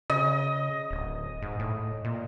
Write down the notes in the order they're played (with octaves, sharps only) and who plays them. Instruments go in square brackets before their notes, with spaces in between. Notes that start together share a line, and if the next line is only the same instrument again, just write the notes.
[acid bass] C#3 [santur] D#5
[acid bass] D1
G#2
A2
A#2